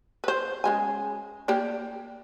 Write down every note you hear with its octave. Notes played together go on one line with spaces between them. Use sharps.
B4 C5
C#3 G#3 G#5
A#3 G4 D5